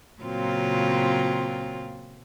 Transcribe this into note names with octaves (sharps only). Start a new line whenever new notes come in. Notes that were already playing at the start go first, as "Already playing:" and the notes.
A#2 C#3 F#3 C4 F4